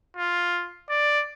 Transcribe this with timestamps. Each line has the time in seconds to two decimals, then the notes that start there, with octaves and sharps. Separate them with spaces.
0.17 F4
0.89 D5